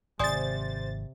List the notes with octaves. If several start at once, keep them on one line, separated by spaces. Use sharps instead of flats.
G#1 C3 C5 D5 G#5 D#6 A6